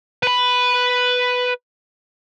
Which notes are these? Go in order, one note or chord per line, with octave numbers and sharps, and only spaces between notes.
B4 B5